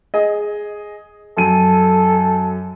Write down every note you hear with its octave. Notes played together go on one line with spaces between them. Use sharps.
G#4 D#5
F#2 A4 D#7